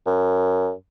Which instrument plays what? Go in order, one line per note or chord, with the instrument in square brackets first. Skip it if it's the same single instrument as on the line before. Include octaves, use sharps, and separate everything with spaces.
[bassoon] F#2